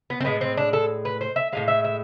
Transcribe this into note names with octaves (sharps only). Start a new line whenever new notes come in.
B3
C4
A2 G#3 B3
C4
D4
A4
B4
C5
E5
A2 F3 G#3 F5
E5
E5